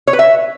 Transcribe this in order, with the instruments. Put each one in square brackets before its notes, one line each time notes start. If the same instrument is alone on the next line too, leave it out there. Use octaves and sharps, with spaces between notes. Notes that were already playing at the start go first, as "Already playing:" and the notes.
[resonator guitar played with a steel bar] C#5
B4
E5